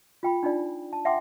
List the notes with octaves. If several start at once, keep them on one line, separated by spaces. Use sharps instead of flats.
F4 G5 B5
D4 D#4 F4 D5
A5
E5 F#5 G5 C6 D6